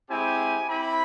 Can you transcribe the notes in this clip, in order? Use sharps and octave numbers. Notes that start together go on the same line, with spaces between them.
G#3 C4 E4 G4 G#5
C4 E4 G4 B5